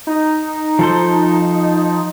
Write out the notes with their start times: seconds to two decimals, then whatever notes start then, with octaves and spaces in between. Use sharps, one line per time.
0.07 D#4
0.79 F3 A4 C5